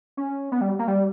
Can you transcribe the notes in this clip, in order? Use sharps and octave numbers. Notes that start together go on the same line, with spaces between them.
C#4
B3
G3
A#3
G3